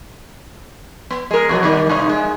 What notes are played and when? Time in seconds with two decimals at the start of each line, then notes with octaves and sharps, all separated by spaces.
1.10 B3
1.31 G#3 A#4
1.49 E2 B2 F#3
1.63 B2 D#3 G3
1.89 G2 C3 D#4
2.09 G#3